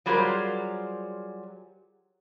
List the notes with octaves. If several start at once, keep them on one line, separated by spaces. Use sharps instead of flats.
F#3 G3 F4 G#4 A#4 C5